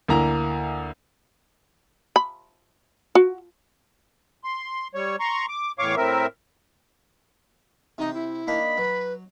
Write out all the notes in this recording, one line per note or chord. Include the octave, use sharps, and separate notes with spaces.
D2 A#3 E4 A#5
B5
F#4
C6
G3 C#5
A#5 C6 C#6
D6
E2 A2 C#5 F5 C#6 D6
A2 C4 A#4 E5
C3 D#4 G5
E4
A#3 D4 D#4 B5
F#3 B4